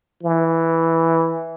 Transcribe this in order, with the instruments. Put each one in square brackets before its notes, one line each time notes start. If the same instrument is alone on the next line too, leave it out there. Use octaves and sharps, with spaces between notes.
[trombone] E3